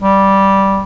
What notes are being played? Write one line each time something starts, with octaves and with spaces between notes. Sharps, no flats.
G3